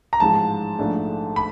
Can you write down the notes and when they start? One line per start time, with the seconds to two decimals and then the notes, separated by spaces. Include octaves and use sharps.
0.13 A#5
0.20 A1 G#2 F3 G#3 A5
0.79 A#1 G#2 F3 A3 D4
1.36 B5